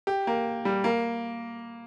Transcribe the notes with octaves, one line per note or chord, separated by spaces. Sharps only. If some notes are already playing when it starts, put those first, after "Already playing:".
G4
A#3
G3
A#3